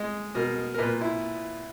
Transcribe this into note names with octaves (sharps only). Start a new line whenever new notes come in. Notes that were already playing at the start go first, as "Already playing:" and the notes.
Already playing: G#3 D#5
B2 A#4
A#4
A#2 B4
E4